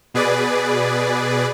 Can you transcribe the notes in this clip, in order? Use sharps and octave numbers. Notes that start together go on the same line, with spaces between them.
B2 G#4 B4 D5